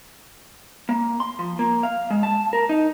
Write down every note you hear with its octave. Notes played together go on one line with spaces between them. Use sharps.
A#3
C6
F3
A#3
F5
G#3
A5
A#4
D#4